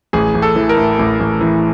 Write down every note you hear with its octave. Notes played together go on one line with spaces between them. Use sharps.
A1 G#4
A1
A4
E3
A#4
A2
A1
A1
E3